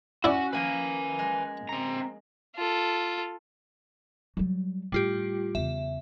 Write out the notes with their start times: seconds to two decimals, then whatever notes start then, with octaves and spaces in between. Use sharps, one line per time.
0.24 C#4 E4 F#4 D5
0.53 F3 A#3 B4 G#5
1.19 G#3
1.69 C4 A#5
2.56 F4 A4
4.37 F#3 G3
4.92 A2 G3 F4 G4
5.55 E2 C#3 E5